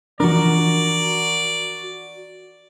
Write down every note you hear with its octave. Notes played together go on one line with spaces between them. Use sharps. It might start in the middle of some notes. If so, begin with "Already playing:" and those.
E3 F3 D4 F#4 A#4 D5